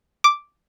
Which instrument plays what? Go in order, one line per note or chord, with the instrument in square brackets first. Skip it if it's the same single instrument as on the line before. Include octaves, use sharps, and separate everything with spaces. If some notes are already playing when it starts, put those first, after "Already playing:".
[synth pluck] D6